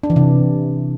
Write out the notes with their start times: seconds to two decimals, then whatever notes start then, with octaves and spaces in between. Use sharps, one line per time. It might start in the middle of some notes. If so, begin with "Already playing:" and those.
0.03 D4
0.10 E3
0.16 C3